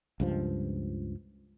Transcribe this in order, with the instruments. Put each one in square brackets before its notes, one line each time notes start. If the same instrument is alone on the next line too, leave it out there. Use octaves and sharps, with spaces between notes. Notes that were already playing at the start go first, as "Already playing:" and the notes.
[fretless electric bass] C#2 G2 F3